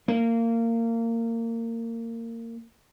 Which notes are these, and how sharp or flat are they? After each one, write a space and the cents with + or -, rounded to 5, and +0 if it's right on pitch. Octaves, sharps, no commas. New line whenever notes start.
A#3 -25